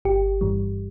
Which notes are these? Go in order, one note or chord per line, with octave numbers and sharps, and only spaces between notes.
G1 G4
G2 E3 G3